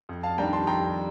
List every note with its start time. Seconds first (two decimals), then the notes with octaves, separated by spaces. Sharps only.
0.09 F2
0.23 F5 A5
0.38 D#3 G3 D4 G5 A#5
0.53 A5 C6
0.67 F2 G5 A#5